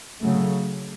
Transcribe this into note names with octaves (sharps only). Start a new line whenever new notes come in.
C#3 F#3 A3